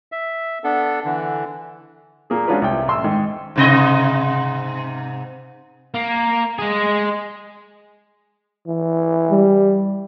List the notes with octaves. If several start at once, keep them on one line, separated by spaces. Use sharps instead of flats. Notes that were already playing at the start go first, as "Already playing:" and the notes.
E5
B3 D4 A4
D3 E3
A#2 A#3 G#4
G#3 C#4 D4 F4 F#4 B4
C2 G5
A1 C6 E6
G#2 D#3
G#2 C3 D#5
A#3
G#3 G#4
E3
G3